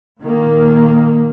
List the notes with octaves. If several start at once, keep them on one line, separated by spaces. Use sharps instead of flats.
A#2 D#3 A#3